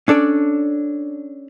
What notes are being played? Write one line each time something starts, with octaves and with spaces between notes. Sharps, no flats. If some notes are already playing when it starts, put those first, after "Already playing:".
C#4 D4 A4 D5